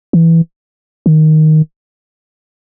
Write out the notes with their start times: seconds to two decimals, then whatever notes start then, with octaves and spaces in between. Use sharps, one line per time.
0.13 E3
1.06 D#3